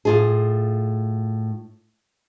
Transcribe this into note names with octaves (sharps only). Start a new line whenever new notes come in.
A2 F4 G#4